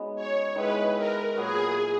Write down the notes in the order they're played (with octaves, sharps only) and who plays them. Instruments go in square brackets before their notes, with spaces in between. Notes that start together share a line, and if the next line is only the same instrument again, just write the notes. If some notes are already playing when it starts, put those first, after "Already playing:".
Already playing: [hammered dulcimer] G#3 B3 C#4 D#4 F#4
[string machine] C#5
[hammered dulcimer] D#3 G#3 B3 E4 [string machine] B4
[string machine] A#4
[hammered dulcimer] A#2 F#3 B3 F#4 [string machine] G#4